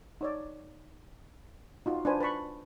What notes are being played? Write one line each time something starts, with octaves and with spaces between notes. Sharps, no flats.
D#4 C#5 D5
D#4 F4 F#4
D4 F4 B4 C5 G#5
B4 A5 B5 C#6